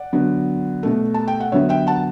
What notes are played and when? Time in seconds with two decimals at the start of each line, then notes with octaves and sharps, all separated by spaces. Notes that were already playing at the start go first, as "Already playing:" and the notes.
Already playing: D5 F#5
0.13 D3 F#3 B3
0.83 B2 A3
1.14 A5
1.28 G5
1.40 F#5
1.52 D3 F#3 B3 C#5 E5
1.69 E5 G5
1.87 F#5 A5